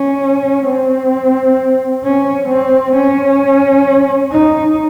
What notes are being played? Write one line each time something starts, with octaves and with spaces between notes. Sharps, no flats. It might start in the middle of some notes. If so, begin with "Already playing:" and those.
Already playing: C#4
C4
C#4
C4
C#4
D#4